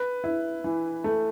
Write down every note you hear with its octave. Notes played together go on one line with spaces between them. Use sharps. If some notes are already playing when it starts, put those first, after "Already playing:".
Already playing: B4
E4
E3
A3